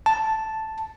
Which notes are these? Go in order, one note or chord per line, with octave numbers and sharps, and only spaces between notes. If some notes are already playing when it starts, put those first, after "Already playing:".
A5